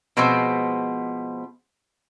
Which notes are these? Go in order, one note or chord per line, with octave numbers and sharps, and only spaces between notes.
B2 F3 G#3 B3 C4 C5